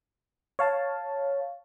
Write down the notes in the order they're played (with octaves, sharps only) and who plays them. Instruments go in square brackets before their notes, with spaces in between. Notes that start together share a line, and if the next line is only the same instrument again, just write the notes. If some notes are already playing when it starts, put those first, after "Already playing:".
[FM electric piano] C#5 F5 A5